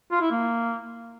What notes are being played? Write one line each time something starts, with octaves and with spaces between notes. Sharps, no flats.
F4
E4
A#3